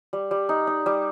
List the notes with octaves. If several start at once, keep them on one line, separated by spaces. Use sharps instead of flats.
G3
G3
D#4
D#4
G3